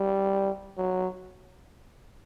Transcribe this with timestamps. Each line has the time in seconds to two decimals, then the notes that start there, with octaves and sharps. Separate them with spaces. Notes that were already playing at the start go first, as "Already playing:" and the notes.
Already playing: G3
0.77 F#3